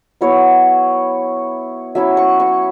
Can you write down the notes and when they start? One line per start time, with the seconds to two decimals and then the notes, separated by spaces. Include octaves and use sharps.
0.21 F#3 B3 E4 C#5
1.95 F#3 C#4 E4 E5
2.17 C#6
2.40 C#6